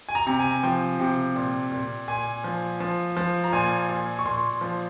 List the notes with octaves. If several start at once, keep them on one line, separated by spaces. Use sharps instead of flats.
G#5
A#5
C3 A#5
G#5
F3 G5
C3
A#2
A#2
A#2 G#5
F3
F3
F3
A#5
A#2 G#5
A#2
C#6
A#2 C6
F3